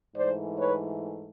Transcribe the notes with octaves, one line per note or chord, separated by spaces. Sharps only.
G#2 E3 A3 C5 D5
B4 C#5